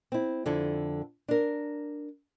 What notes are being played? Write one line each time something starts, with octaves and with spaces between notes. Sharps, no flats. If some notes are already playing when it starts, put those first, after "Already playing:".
C4 E4
F2 D3 D4 E4 A4
D4 A#4